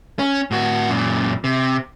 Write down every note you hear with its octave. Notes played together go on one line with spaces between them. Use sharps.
C#4
A2 F#4
F#2 A#2
C3